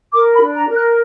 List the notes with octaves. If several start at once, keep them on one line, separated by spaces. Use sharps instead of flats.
A#4 D6
B5
D4
A#5
A#4
F#6